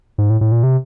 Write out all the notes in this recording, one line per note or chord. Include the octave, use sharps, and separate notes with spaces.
G#2
A2
A2
A#2
C3